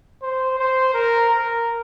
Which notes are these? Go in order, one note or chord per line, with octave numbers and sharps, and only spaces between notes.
C5
C5
A#4
A#4